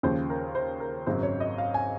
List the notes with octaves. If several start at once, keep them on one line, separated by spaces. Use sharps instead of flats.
D#2 C#3 F3 C5
A#4
C5
A#4
G#1 F#2 C#3 F#3 C5
C#5
D#5
F5
G#5